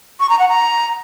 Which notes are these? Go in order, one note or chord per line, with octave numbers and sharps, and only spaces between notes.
C#6
A#5
F#5
A#5